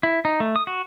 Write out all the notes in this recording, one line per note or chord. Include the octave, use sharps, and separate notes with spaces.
E4
D#4
A3
D#6
F#4